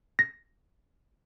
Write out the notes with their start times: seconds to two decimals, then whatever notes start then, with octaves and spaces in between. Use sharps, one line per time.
0.19 A#6